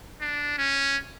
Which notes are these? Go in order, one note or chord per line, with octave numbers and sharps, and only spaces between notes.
D4
C#4